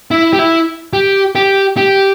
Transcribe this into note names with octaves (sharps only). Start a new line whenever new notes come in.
E4
G4
E4
G4
G4
G4